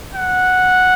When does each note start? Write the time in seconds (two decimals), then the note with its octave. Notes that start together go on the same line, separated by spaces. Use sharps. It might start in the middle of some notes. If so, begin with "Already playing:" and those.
0.15 F#5